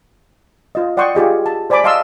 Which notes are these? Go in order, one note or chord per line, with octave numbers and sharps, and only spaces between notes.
F4 D#5
D5 F#5 G5 C6 C#6 D#6
F4 G4 G#4 D#5
A5
C5 D5 G#5 B5 D6
D#5 F5 A5 C6 D#6 E6